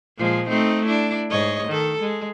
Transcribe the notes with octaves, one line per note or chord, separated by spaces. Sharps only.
A#2 F3 G#3
A3 C4 D#4
D4 E4
G#2 C#5 D#5
D#3 A4
G#3